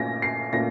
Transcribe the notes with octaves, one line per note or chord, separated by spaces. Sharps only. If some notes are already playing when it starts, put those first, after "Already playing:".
Already playing: A#2 A3 C#4 A#6
C7
A#2 A3 C#4 A#6